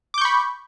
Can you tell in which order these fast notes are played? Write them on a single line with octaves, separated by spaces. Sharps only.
D6 G6 C#6 B5